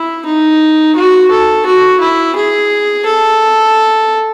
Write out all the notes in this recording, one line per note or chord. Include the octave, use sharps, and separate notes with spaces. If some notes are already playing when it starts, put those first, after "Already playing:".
Already playing: E4
D#4
F#4
A4
F#4
E4
G#4
A4